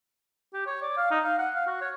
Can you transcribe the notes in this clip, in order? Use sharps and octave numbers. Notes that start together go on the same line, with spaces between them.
G4
C#5
D5
F5
D#4
F5
F#5
F5
F#4
C#5